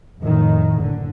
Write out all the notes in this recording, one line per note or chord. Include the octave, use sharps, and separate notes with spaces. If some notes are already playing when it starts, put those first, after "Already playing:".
F2 A2 D#3
F#1 D3